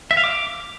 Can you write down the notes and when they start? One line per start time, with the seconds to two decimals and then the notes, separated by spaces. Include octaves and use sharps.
0.11 E5
0.17 F5
0.24 D6